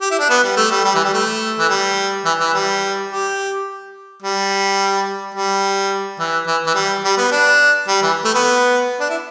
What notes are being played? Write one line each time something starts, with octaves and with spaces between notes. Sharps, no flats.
G4
E4
D4
B3
G3
A3
G3
G3
E3
G3
A3
E3
G3
E3
E3
G3
G4
G3
G3
E3
E3
E3
G3
G3
B3
D4
G3
E3
A3
B3
D4
E4